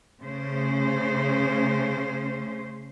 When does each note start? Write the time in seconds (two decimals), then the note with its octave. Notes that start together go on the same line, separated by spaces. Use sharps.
0.21 C#3 A3 C#4 C5